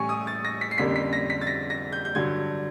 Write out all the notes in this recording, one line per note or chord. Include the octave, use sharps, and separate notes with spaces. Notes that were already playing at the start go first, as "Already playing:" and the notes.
Already playing: A2 E3 G3 C#4 G#5 C#6
D#6
A6
A#6
B6
C7
F2 D3 G3 A#3 C#4 B6
B6
A#6
B6
A6
A#6
A#6
G6
G6
G2 D3 F#3 G#6